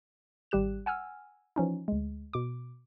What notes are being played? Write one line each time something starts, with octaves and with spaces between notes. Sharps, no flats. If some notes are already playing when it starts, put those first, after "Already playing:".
G#1 G3 G4 F#6 E7
F#5 G#5 E6 F6
E3 F3 C#4 D#4
D2 G#3
B2 D6